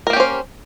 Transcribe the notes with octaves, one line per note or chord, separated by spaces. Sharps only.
A#3 C#4 G4 A#4 C5